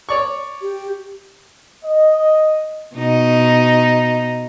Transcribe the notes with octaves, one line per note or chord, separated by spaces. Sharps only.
C#5 D5 C#6
G4
D#5
B2 D#4